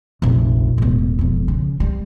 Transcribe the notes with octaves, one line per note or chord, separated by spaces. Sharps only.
F1 A#1
E1 A2
E1 F2
C#3
G3